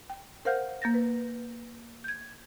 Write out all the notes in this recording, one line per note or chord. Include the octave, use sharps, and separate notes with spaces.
G5
A#4 C5 F5 F#5 F6 G6
A#3 G6 A6 A#6
B4
G6 G#6